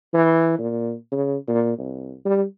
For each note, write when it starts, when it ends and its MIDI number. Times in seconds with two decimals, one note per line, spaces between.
0.13 0.57 52
0.58 0.94 46
1.12 1.36 49
1.48 1.74 46
1.78 2.14 36
2.25 2.44 55